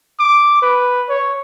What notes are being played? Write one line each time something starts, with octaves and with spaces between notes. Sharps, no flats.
D6
B4
C#5